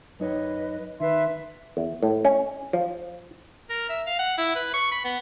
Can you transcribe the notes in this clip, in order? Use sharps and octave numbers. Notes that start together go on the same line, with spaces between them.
F#2 D#4 B4 C#5 D#5
D#3 B4 E5 C6
E2
A2
C#4
F3
A#4
E5
F5
F#5
E4
B4
C#6
B5
B3